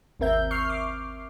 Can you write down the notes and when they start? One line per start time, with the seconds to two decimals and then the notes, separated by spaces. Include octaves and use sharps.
0.20 G#1 D#2 C4 A#4 E5 G6
0.51 C#6 F6 C7
0.69 D6